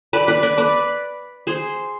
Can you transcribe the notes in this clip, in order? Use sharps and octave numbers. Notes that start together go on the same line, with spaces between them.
B4 D5
B4 D5
B4 D5
B4 D5
G#4 C5